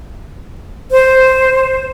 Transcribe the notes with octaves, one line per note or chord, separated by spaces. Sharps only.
C5